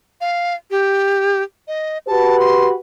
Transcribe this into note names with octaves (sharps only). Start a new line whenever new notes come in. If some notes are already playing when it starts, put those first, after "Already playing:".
F5
G4
D#5
F#4 G4 B4 A5
C6